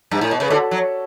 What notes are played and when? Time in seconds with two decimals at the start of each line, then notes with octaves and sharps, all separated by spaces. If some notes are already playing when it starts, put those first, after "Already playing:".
0.11 G2
0.21 A2
0.31 B2
0.40 C#3 B4
0.50 D3 F#4 A4
0.71 F#3